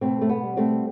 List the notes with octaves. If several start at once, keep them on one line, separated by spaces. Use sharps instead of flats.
B2 A3 C4
A3
B3
G3
A3 C4